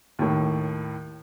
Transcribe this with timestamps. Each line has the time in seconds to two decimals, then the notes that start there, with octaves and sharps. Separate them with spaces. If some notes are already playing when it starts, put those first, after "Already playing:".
0.19 D#2 A2